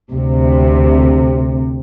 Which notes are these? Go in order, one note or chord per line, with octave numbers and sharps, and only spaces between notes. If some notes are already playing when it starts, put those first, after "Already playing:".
D2 C3